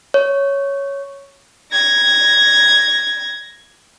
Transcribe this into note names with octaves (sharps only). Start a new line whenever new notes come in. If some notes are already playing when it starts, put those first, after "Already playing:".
C#5
G#6 A#6